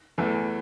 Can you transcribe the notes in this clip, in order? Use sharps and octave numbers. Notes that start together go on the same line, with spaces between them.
E2 E3 A3